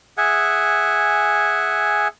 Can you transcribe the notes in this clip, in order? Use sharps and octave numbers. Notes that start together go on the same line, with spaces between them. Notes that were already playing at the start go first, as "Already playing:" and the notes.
G#4 E5 F#5 G#5